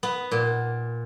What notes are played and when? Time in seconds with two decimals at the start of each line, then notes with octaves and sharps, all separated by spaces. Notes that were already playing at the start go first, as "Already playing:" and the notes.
0.03 B3
0.31 A#2